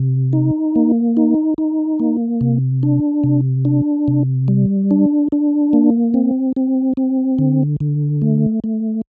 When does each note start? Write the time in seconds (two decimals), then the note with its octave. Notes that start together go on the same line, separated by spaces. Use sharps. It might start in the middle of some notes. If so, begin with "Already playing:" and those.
Already playing: C3
0.33 D#4
0.76 A#3
1.17 D#4
1.58 D#4
2.00 A#3
2.41 C3
2.83 D4
3.24 C3
3.65 D4
4.08 C3
4.48 G3
4.91 D4
5.32 D4
5.73 A#3
6.14 C4
6.56 C4
6.97 C4
7.39 D3
7.80 D3
8.22 A3
8.64 A3